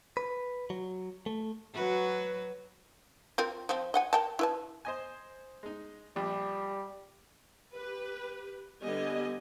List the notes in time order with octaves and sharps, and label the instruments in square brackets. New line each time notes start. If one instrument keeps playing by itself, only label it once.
[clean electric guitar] B4
F#3
A3
[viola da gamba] F#3 F#4 B4
[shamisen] C4 F4 A#4
F3 C4
D#5 F#5 G#5
A#4 G5 A5
E4 B4 A5
[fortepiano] C5 D#5 G#5
G#3 D#4
[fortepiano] A#1 [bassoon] G3
[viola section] G4 B4
D3 G3 B3 G4 D#5 G#5